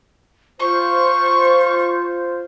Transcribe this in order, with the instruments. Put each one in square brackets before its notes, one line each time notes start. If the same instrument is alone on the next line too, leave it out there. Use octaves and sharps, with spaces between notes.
[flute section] F4 C5 [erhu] C#6